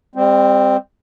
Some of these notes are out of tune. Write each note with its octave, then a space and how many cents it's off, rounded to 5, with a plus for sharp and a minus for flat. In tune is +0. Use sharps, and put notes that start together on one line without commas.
G3 +40 C4 +0